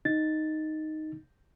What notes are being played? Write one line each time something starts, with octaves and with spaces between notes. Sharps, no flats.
D#4 A6